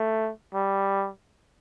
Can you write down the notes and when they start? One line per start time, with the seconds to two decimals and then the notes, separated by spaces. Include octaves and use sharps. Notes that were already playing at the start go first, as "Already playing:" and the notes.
Already playing: A3
0.54 G3